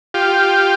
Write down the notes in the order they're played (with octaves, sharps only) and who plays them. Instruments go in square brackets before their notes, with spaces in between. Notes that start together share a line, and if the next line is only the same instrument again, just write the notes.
[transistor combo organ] F4 G4